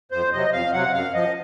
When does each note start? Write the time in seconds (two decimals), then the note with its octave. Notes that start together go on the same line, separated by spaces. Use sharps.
0.11 F2 C5
0.32 C3 F#3 D#5
0.52 F2 F5
0.73 C3 F#3 F#5
0.93 F#2 F5
1.14 F3 D#5